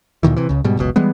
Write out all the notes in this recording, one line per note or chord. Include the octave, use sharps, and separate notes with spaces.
D2 A#2 D#3 E3
C3 E3
C#2 C#3
G#2 B2 G3
F#1 C#2 B2
E3 G3 G#3 B3